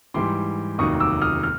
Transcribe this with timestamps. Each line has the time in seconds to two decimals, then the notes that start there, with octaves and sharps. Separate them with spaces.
0.14 G#2 E3 G3 C6 D6
0.78 F1 D#2 D#3 F#3 C#6 D#6
1.00 D6 E6
1.22 D#6 F6
1.43 F6